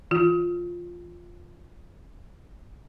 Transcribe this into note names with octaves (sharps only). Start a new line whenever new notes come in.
E3 F4